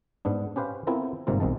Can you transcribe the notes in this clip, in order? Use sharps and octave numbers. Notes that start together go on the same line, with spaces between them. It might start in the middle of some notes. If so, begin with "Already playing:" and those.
G#2 B3 D4
C#4 G4 B4 C5 F5
B3 C4 E4 F4 A4 A#4
G1 G#2 C3 A#3 F4
B1 C3 D#3 A5